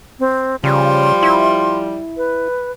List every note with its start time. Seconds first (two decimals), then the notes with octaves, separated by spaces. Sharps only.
0.20 C4
0.64 C#3 F3 G3 C6
1.23 E4
2.17 B4